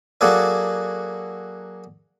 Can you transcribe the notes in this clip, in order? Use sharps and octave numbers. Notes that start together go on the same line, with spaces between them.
F#3 A#3 F#4 G#4 A4 D5